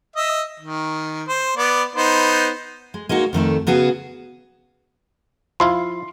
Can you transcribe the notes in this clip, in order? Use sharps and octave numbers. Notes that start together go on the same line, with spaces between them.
D#5 E5
D#3
C5
B3 D5
B3 D#4 C5
G#3
G#3 A#3 D#4 F#4
F2 D#3 A3 A4
C#3 B3 F#4 G#4
F3 E4 F4 C6